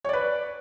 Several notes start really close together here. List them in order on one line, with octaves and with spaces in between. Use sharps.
C#5 D5 B4